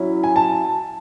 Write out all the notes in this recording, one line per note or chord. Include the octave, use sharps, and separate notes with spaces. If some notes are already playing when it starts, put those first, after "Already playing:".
Already playing: F#3 C#4 E4
G#5
A5